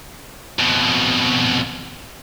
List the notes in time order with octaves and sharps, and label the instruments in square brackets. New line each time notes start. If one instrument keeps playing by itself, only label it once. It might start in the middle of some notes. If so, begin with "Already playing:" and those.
[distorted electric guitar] F2 B2